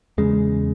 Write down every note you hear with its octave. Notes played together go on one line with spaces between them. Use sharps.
E2 C#3 G#3